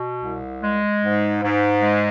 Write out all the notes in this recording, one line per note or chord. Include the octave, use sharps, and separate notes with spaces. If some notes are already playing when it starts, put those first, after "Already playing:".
Already playing: B2
C2
G#3
G#2
G#2
G#3